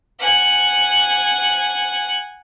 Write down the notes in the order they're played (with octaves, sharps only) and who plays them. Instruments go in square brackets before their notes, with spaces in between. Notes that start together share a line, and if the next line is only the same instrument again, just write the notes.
[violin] F#5 G#5